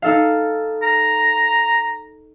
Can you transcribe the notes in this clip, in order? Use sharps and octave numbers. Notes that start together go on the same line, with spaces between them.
D#4 A4 F5
A#5